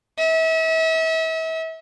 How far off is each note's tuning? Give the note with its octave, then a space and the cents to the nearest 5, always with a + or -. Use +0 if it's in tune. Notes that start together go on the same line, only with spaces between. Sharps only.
E5 -35